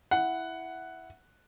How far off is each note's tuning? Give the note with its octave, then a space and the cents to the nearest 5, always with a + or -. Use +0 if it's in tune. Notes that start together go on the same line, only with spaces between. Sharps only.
E4 +0 F#5 +0